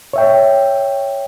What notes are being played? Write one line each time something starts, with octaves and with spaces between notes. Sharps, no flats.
C#5 E5 G5